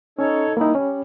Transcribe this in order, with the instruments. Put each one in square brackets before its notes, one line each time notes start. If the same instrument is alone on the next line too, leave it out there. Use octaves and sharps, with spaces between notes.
[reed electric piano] C#4 [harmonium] D#4 A4 C#5
[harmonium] G3 E4 [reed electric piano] A#3 D#4
[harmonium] G3 [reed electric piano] C#4